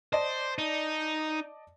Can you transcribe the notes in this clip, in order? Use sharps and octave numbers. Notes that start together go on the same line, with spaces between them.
C5 D5 D#5 A5
D#4